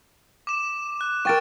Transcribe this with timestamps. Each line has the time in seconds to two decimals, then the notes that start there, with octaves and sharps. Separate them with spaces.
0.47 D6 E7
1.01 F#6
1.25 A#4 G5 C#6 A6 D7